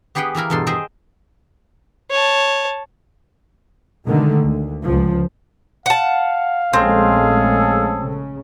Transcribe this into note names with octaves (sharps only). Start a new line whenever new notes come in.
B3 G4 G#4 B4 F#5 G5
E3 A#3 E4 A#4
E2 G2 B2 A4 C6
G#4 C5 D#5 E5 G5
C#5 A5
B2 D3 D#3 G#3 A3
D2
C#2 F3
F5 F#5 A5
A#1 G#3 A3 C4 C#4 G#4 A4
C#3